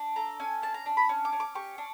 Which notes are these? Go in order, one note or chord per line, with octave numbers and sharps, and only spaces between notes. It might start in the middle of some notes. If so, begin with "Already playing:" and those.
Already playing: D4
A4 A#5
C#4 G#5
D4 A5
A#5
D4
B5
C#4
D6
C#4
D6
G4 C#6
D4